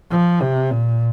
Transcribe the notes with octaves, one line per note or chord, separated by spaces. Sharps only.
F3
C3
A#2